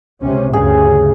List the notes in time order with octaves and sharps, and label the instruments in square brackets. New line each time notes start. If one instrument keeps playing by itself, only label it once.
[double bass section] C#2 C3 C#4
[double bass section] D2 G2 C#3 [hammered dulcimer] G#4